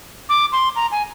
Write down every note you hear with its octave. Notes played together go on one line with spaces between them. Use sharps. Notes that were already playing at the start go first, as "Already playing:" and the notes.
D6
C6
A#5
G#5